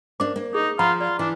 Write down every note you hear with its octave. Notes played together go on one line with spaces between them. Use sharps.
A#3 D4 C5 D6
A#3
D#4 G#4
F3 F4 F#5 A#5 B5
F4 D5
E3 D4